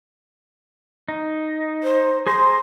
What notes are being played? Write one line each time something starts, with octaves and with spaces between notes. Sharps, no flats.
D#4
C5
G#4 C5 A#5 C6